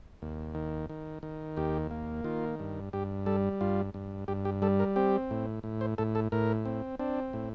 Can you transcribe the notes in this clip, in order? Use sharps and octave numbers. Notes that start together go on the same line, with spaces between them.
D#2
D#3
D#3
D#3
D#2 G4
A#3
D#3 F4
G2
G2 G4
G3 A4
G2 F4
G2
G2 G4
G4
G3 A4
A#4
C4 G4
A2
A2
C5
A2 A4
A4
A2 A#4
C4
C4 D4
A2